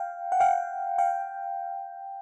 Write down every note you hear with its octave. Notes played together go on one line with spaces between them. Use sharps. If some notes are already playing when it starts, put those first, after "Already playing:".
Already playing: F5 G5
F#5
F5 G5
F5 G5